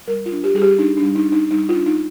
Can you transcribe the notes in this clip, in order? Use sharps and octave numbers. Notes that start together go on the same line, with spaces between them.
G3 A#4
F4
D4
G4
G3 G#4
G4
D4 D#4
D4
G3
D#4
D4
D#4
G3 D#4
F4
D4
D#4